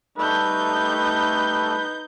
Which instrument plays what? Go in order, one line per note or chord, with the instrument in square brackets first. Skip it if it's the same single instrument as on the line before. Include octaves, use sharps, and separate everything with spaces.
[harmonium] G3 A3 A4 [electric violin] D#4 G6 [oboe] B4